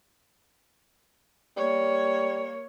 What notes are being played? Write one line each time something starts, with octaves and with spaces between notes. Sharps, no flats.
G3 A#3 C#5